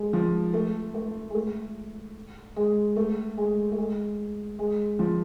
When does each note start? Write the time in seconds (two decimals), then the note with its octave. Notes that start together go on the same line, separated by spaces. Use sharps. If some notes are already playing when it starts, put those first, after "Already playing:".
Already playing: G#3
0.13 F3
0.54 A3
0.94 A3
1.30 G#3
1.34 A3
2.56 G#3
2.96 A3
3.37 G#3
3.72 A3
3.78 G#3
4.59 G#3
4.99 F3